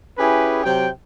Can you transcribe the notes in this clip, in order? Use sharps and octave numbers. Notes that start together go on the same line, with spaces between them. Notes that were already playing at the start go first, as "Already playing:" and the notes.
C#4 E4 G4 G#4 B4
C3 F#3 G5